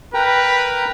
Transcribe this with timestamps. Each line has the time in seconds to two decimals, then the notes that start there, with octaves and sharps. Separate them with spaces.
0.14 A#4 B4 G5 A#5